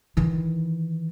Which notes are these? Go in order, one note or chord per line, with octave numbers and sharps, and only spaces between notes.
D#3 E3